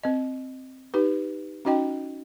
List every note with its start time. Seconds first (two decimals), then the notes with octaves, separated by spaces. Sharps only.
0.03 C4 D#5
0.94 D#4 G4 B4
1.65 C#4 D#4 F#4 D#5 G5